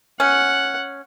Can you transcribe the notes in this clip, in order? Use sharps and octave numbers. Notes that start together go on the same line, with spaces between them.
C#4 F#5